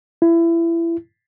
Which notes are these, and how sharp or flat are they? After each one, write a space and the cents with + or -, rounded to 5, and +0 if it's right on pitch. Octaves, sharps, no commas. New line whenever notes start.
E4 +25